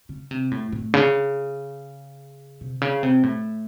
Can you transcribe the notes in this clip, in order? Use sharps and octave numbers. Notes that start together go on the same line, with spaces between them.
C#3
C3
A2
A2
C#3
C3
C#3
C3
A2